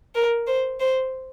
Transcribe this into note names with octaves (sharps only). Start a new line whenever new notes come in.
A#4
C5
C5